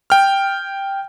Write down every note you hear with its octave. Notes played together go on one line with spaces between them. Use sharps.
G5 F6